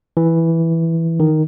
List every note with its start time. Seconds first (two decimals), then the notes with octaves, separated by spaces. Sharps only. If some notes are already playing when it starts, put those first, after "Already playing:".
0.17 E3
1.20 D#3